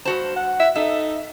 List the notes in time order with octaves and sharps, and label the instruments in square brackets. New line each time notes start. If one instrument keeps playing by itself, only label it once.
[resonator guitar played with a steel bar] G2 F#4 A5 [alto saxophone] C5
[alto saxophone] F#5
[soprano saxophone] E5
[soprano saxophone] D#4 [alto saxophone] A4 [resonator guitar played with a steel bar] E5